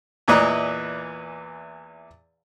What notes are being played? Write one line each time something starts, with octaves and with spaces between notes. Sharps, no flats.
E2 A#2 E3 B4 D#5 A#5